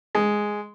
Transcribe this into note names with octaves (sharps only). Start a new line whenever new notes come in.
G#3